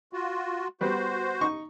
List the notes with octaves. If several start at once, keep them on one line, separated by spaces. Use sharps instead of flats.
F4 F#4
G3 B3 F#4 C5
D#4 C#6